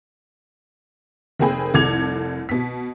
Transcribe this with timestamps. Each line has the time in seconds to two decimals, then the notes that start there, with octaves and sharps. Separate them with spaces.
1.39 F1 A#3 C4 G#4 G5 B5
1.74 F1 C2 A4 D6 G#6 F7
2.49 B2 B6